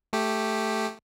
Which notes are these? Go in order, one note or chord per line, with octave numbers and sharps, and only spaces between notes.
A3 G4